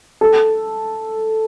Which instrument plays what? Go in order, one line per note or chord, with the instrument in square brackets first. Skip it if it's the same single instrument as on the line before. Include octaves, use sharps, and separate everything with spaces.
[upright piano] A4